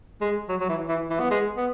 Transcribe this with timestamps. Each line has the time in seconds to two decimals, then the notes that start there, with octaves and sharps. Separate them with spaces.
0.21 G#3
0.49 F#3
0.60 F#3
0.69 E3
0.89 E3
1.10 E3
1.20 B3
1.31 G#3
1.57 B3